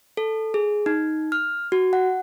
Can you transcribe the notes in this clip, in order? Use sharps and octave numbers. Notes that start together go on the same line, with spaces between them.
A4
G#4
D#4
F6
F#4
F#5